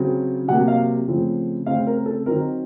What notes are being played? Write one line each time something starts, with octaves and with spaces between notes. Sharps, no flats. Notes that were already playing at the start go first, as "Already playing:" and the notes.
Already playing: C#3 F#3 C4
C3 F#3 A#3 F#5
F5
C#3 F3 A3 C4
C#3 A3 C4 F5
A#4
A4
D#3 F#3 C4 A#4